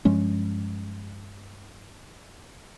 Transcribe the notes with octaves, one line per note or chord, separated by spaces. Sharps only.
G2 F3 G#3 C#4